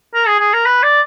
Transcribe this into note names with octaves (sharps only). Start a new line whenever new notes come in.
A#4
G#4
G#4
A#4
B4
D5